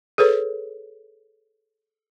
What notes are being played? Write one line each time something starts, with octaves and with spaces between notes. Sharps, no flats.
G#4 A4 B4 C#5